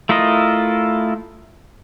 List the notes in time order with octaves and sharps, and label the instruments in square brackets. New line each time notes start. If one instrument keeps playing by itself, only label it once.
[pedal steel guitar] A3 E4 F4 A#4 D#5